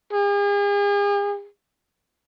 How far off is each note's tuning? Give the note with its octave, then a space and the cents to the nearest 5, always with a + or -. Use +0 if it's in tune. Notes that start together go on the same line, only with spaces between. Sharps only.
G#4 -40